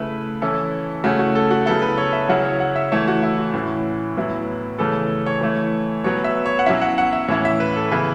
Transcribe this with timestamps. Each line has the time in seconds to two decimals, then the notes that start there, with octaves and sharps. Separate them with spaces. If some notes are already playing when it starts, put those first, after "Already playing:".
Already playing: C#3 A3 E4 B4
0.42 E3 C#4 E4 A4
1.04 C#3 A3 C#4 E4 F#4
1.19 F#4
1.35 A4
1.50 F#4
1.66 C#3 F#3 B3 E4 A4
1.82 B4
1.98 C#5
2.13 E5
2.29 C#3 F#3 C#4 E4 F#5
2.45 C#5
2.60 F#5
2.76 E5
2.92 E3 A3 E4 C#5
3.08 F#4
3.23 E4
3.39 F#4
3.54 A2 E3 C#4
4.17 A2 F#3 B3 E4
4.78 C#3 E3 A3 C#4 A4
5.26 C#5
5.41 E3 A3 E4
6.04 B2 F#3 B3 C#5
6.24 E5
6.46 C#5
6.59 F#5
6.66 B2 F#3 C#4 E4 E5
6.81 F#5
6.98 F#5
7.13 E5
7.28 A2 E3 C#4 E4 C#5
7.45 E5
7.60 B4
7.76 A4
7.91 C#3 E3 B3 E4 B4